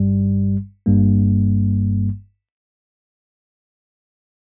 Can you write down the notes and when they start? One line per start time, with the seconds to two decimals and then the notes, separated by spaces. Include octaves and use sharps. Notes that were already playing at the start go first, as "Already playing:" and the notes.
Already playing: G1 G2 G3
0.86 G1 G2 G3 A#3